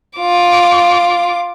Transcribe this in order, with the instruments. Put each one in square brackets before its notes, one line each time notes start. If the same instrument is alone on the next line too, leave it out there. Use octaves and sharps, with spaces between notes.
[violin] F4 D6